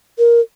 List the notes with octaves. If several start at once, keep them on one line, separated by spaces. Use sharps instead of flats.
A#4